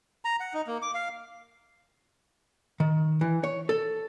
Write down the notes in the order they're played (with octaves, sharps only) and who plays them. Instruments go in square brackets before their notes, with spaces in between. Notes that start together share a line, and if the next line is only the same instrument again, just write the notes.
[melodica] A#5
F#5
D#4
A#3
D6
F5
[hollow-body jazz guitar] D#3
E3
C#5
A4